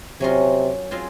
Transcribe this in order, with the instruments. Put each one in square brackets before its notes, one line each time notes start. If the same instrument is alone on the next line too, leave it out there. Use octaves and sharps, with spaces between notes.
[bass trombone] C3 [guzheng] F#3 C#4 F4 A#4 D#5
[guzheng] F#3 C4 F4 G#4 D#5